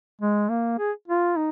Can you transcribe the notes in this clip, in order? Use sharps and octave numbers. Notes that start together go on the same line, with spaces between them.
G#3
A#3
G#4
F4
D#4